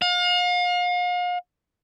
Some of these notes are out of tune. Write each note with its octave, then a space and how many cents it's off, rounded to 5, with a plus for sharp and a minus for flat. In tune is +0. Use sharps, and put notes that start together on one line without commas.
F5 +40